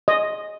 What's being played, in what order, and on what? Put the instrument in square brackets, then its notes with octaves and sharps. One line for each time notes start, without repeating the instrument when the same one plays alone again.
[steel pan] D#5